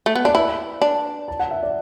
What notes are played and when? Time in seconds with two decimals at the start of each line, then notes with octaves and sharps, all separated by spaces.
0.06 A3
0.15 B3
0.25 D4 D5
0.35 E4 B4
0.82 D4
1.28 A5
1.39 F#5
1.51 E5
1.63 D5